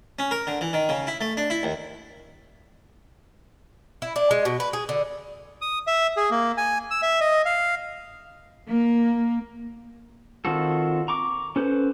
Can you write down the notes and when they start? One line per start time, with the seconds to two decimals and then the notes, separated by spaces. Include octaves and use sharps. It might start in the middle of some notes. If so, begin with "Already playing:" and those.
0.19 C#4
0.31 A#4
0.47 D3
0.61 E3
0.73 D#3
0.89 C#3
1.07 E4
1.21 A3
1.37 D4
1.50 E4
1.63 D#2
4.02 E4
4.16 D4
4.31 G#3
4.45 B2
4.60 B4
4.73 G#4
4.89 D3
5.61 D#6
5.87 E5
6.17 G#4
6.31 A#3
6.57 G#5
6.91 E6
7.02 E5
7.21 D#5
7.45 F5
8.69 A#3
10.45 D#3 C4 F4 F#4 A4
11.08 A#5 C#6 D6
11.56 C#4 A4 B4 C5